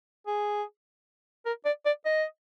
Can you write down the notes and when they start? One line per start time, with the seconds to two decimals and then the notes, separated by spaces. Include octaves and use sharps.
0.27 G#4
1.46 A#4
1.65 D5
1.86 D5
2.06 D#5